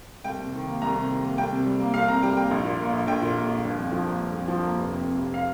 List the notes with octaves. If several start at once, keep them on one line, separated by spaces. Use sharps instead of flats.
C2 G5
C3
D#3
A#3
C2 A#5
C3
D#3
A#3
C2 G5
C3
G3
A#3
C2 F5
C3 A#5
G3 G5
A#3 G5
A#1
A#2
A#3
A#1
A#1 G5
A#2
A#3
A#1
G1
F2
F3
A#3
G1
F2
F3
A#3
F1
F2
C3
F1
F5